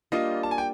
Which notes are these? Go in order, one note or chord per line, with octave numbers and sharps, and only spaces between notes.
G3 A#3 D4 F4 D#5 F5
A5
G#5
G5